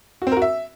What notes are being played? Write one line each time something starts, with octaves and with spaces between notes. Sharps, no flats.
F#4
C4
A#4
F#4
E5